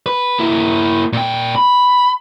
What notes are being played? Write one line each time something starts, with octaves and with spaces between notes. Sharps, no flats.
B4
A#3 E4
A#2 G5
B5